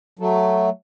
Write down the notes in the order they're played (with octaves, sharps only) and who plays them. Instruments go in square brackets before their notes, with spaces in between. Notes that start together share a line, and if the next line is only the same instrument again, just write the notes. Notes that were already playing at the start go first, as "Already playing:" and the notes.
[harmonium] F#3 A3